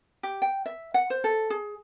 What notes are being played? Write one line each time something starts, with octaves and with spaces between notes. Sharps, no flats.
G4
G5
E5
F#5
C5
A4
G#4